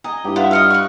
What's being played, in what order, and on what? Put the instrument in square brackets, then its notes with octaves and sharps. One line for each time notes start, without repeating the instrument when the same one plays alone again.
[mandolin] D#5 [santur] G#5 A#5 D#6
[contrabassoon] G2 [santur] E4 G4
[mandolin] B3 [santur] F4 [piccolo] E5
[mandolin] A4 C#5 D#5 [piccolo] F6
[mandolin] C#6 F#6